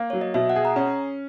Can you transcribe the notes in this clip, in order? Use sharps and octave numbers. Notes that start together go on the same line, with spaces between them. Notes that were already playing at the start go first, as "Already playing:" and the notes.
Already playing: A#3
F#3 C#5
D#5
B2 E5
F#5
G#4
A#5
C#4